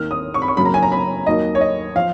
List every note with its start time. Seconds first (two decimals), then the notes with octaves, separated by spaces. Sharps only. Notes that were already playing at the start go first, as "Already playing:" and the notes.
Already playing: D#2 D#3 A#3 F6
0.11 D#6
0.34 C#6
0.42 B5
0.48 C#6
0.57 F#2 C#3 F#3 A#3 B5
0.65 A#5
0.74 G#5
0.83 A#5
0.92 B5
1.27 D#2 D#3 F#3 A#3 D#5
1.55 C#5
1.61 D#5
1.96 F3 F5